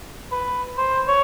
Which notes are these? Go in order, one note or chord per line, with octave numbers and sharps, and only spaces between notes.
B4
C5
C#5